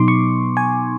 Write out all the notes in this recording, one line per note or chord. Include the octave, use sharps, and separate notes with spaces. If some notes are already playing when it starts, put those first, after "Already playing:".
Already playing: B2 F#3 B3 D#4 C6 D6
C#6
G#5